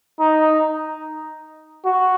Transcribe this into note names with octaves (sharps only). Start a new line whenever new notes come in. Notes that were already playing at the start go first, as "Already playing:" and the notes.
D#4
F#4